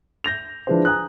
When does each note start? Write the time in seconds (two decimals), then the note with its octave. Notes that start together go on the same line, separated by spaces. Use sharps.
0.24 G6 A#6 F7
0.67 F3 D4 E4 G#4 B4 C5
0.85 G#5 A#5 D#6 F#6